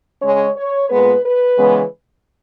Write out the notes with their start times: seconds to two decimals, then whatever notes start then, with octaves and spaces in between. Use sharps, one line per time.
0.22 C#3 G#3 C#4 C#5
0.56 C#5
0.89 A#2 G#3 B3 B4
1.24 B4
1.57 C#3 E3 G#3 B3